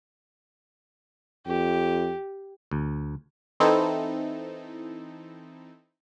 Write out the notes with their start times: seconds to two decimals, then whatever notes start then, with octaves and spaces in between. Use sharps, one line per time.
1.47 F2 G4
2.71 D2
3.60 E3 C4 D#4 E4 A4